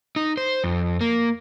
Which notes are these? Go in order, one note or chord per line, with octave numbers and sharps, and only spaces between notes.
D#4
C5
F2
A#3